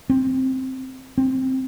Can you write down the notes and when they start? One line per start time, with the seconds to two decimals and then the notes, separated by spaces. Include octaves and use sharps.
0.10 C4
1.18 C4